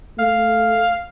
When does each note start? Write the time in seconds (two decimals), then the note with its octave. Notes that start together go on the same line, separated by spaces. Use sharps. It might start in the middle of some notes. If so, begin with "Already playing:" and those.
0.19 A3 F5